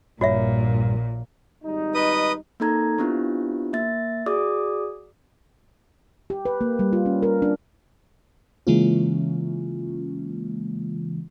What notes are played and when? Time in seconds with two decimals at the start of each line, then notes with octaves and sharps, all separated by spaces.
0.21 A#1 G2 A#2 F#4 C#5 E5
1.64 G#1 G3 D#4
1.94 B4 D#5 D#6
2.60 A#3 C4 D#4 A4 A#5 G#6
2.98 B3 C4 D4 E4 F4 G4
3.73 A#3 E5 A6
4.26 F#4 G#4 D5 D6 D#6
6.30 G4
6.45 B4
6.61 A#3
6.79 G3
6.93 F4
7.06 C#4
7.23 A#4
7.42 D4
8.67 C#3 E3 G#3 A#3 C#4 F4